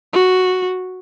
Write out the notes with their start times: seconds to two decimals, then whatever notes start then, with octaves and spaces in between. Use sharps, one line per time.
0.13 F#4